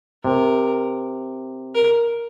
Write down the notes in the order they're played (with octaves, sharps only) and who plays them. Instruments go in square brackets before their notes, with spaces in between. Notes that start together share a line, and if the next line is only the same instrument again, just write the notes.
[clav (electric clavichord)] C3 [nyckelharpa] A#4
[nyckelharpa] A#4